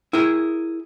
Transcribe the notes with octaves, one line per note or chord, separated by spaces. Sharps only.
E4 G#4 A#4